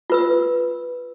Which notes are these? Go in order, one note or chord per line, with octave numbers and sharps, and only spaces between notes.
F4 B4 E6